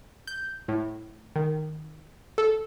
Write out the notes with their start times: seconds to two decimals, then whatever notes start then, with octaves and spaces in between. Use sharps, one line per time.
0.27 G6
0.68 A2
1.36 D#3
2.38 A4